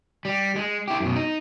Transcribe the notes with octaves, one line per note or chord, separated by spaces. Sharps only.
G3
G#3
E4 G4
F#2 B2
D#4